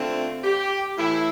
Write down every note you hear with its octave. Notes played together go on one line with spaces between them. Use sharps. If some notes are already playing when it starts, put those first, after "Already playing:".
Already playing: D3 A3 C4 F4
G4
A2 E3 A3 E4